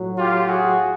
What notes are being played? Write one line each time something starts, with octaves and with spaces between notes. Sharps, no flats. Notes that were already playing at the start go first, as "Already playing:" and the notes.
Already playing: A2 F#3
F4 G4
F#4 G#4